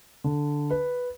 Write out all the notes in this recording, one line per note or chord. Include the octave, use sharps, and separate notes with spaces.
D3
B4